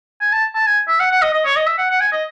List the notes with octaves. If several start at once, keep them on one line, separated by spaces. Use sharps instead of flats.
G#5
A5
A5
G#5
E5
F#5
F#5
D#5
D#5
C#5
D#5
E5
F#5
F#5
G#5
D#5